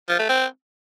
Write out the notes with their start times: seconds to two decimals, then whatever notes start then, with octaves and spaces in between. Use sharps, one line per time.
0.09 F3
0.19 A3
0.29 C4